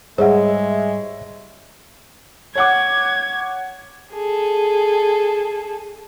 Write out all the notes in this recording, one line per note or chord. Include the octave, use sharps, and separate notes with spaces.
G#2 G3 G#3 G#4 C#5 D#5 E5 F#5
C#5 F#5 D6 G#6
G#4 A4